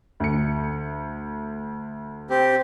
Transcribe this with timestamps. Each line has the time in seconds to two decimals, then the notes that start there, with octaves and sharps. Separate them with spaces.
0.20 D2 C#7
2.30 C4 G4